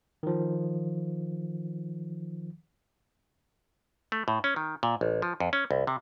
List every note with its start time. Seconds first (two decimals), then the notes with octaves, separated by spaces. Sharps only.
0.23 D#3 F3
4.12 A3
4.28 A2
4.44 C#4
4.56 D#3
4.83 A#2
5.01 A1
5.22 F3
5.40 F2
5.53 C#4
5.71 C2
5.87 C3